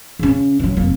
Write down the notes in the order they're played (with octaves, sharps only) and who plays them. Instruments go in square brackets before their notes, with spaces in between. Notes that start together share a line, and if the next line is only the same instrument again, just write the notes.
[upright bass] C#3 C#4
E3 F#3
F1 A#3